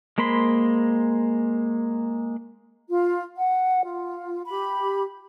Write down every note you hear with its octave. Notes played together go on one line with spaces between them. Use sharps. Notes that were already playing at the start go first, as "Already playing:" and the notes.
G#3 A#3 C5 B5 C6
F4
F#5
F4
G4 B5